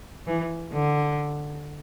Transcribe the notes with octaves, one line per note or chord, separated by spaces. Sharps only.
E3
D3